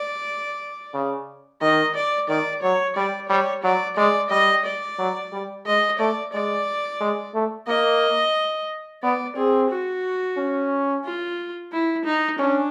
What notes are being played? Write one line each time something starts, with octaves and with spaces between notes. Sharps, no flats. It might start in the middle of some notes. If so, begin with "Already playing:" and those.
Already playing: D5
C#3
D#3 D#5
D5
D#3 D5
F#3 C#5
G3 D5
G3 C#5
F#3 D5
G#3 D5
G3 D#5
D5
F#3
G3
G#3 D#5
A3 D5
G#3 D5
G#3
A3
A#3 D#5
B3 D5
C4 G#4
F#4
C#4
F4
E4
D#4
C#4 D4